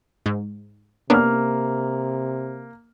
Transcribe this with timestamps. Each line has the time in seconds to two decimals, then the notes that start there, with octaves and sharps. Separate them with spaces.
0.26 G#2
1.10 C3 A#3 B3 C#4 D4 F6